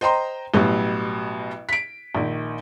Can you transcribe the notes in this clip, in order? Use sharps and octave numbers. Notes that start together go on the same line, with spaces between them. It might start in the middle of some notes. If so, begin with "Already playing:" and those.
C5 D#5 G5 A#5 C6
A1 B2 F#3 G3
B6 D7
A#1 D#3